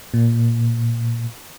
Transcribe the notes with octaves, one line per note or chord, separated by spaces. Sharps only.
A#2